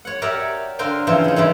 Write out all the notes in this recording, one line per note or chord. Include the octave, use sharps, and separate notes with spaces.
C#5 F#5
F#4 G4 A#4 C#5 D5 E5
D3 A#4 C5 F5 G5
C#3 E3 F3 C4
F#3 D#4
D#3 E3 G3 G#3